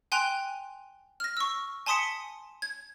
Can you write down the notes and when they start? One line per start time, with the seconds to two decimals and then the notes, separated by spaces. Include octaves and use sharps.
0.12 G5 G#5 C6 F#6 F7
1.20 F6 A#6
1.37 C#6 E6
1.86 G#5 A5 C6 D#6 B6 C#7
2.62 G#6